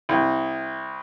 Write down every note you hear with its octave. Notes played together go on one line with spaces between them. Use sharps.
C2